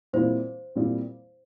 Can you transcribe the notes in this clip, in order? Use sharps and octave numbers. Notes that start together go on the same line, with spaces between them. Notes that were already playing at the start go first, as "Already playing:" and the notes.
A#2 G3 C4 E4 C5
A#2 G3 C4 E4